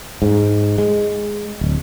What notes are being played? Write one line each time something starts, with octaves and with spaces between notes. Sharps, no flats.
G#2
G#3
D1